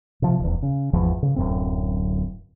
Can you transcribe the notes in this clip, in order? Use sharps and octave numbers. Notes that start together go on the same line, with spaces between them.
C3 F3
D#1 E2
C#3
G#1 E2 F3
C#3
D1 F#2 C4